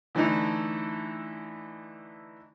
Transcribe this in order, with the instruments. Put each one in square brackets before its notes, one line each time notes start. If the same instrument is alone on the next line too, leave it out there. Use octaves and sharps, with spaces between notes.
[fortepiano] D3 E3 A3 D#4 E4